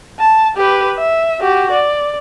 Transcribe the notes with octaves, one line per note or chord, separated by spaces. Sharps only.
A5
G4 B4
E5
F#4 G4
D5